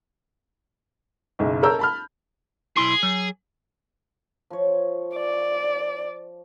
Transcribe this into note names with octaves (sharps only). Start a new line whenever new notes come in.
F#1 B1
A4 A#4 C#5 A#5 E6 G6
A5 B5 F6
B1 E4 G#4 C6
F#3
F3 C#5
D5